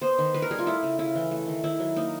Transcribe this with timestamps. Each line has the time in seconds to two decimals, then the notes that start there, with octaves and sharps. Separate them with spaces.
0.02 B3 C5
0.19 D#3
0.34 D#3 B4
0.42 A#4
0.51 G3 G#4
0.59 F4
0.66 A3 E4
0.83 C#3
0.99 C#3 E4
1.15 E3
1.31 A3
1.47 D#3
1.64 D#3 E4
1.80 F#3
1.96 A#3 D#4